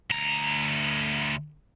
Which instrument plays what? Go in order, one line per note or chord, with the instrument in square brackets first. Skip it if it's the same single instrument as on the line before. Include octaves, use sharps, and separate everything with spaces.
[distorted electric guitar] D2 A#5